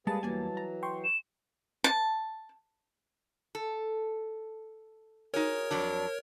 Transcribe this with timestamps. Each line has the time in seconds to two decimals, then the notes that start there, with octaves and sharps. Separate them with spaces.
0.07 G3 G#3 A#3 G#4 B4 A5 A6
0.23 E2 E3 F#3 A#3 G#5
0.57 A#5
0.83 G5 C6 C#6
1.04 E7
1.84 A5
3.55 A4
5.34 D#4 F#4 G#4 A#4 C#5
5.71 F2 F#3 D4